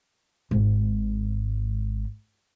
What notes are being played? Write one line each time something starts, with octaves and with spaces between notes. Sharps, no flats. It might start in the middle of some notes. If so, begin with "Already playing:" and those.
G#1 G#2